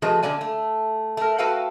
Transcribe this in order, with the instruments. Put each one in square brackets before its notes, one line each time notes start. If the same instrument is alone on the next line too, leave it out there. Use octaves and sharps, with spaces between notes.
[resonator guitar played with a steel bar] F3 G#3 A3 F#4 G#4 B4
D3 A#3 D5 G#5
A3
A3 A#4
F#4 A4 B4 F5 G5